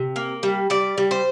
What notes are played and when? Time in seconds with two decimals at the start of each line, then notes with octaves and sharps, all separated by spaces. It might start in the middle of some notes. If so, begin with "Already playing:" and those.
Already playing: C3
0.16 A#3
0.43 G3
0.70 G3 D5
0.98 G3
1.11 C5